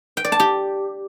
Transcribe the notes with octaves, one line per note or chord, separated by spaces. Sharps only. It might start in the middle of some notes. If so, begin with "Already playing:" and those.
G5
D5
A5
G4